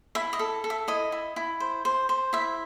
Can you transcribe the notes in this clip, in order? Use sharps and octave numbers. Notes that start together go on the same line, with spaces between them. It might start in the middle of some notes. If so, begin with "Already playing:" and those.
E4 E5
D#5
A4
A4
E5
E4 D#5
E4
E4
C5
C5
C5
E4 E5